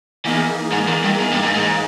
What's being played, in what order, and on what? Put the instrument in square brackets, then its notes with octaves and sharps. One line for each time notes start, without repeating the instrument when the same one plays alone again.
[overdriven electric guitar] E2 [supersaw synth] E3 A#3 D#4 G#4
[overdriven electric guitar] G#2
E2
G2
E2
G2
G#2
G#2